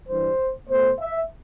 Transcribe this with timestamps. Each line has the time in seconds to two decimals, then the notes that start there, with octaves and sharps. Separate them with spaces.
0.09 G2 E3 G3 C5
0.70 B2 A3 C5
0.99 E5